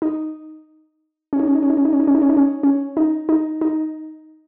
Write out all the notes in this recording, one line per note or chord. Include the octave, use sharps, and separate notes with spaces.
D#4
C#4
D#4
C#4
D#4
C#4
D#4
C#4
D#4
C#4
D#4
C#4
D#4
C#4
D#4
C#4
C#4
D#4
D#4
D#4